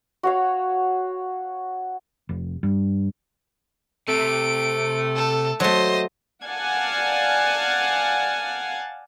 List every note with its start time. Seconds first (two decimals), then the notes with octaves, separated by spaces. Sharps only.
0.23 F#4 C#5 F5
2.29 F1
2.63 G2
4.08 C3 A3 D7
5.16 A4
5.60 F#3 A3 C5 D#5
6.44 D5 F5 F#5 G#5 A5